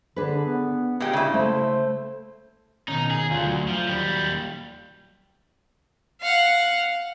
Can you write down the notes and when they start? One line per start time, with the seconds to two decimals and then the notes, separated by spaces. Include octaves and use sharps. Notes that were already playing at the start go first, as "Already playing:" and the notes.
0.16 D3 D4 G#4 B4
0.45 B3
1.00 A#2 G#3 G4
1.13 C#3 E4
1.34 A3 C5
2.88 B2 D#3 C#4 D#4
3.11 G#4
3.31 D2 F4
3.46 F#3
3.68 F3
3.88 D#2 G3
6.21 F5 F#5